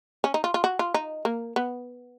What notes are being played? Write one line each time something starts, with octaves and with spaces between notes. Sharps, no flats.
C#4
D#4
F4
F4
F#4
F4
D#4
A#3
B3